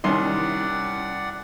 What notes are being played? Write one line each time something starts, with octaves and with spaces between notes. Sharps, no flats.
C2 D#3 C#4 E4 D5 F#5 C6